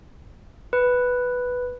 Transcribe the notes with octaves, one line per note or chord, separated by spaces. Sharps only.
B4